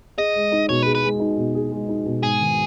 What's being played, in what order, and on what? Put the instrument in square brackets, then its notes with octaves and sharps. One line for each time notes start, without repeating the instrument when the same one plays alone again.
[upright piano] G#4 [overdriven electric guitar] D#5
[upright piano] G#3
D#4
[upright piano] B2 [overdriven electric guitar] C#5
[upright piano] G#4 [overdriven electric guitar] B4
[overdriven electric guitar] B4
[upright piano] G#3
D#4
B2
G#4
G#3
D#4
B2
[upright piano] G#2 [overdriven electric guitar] G#4
[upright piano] D#3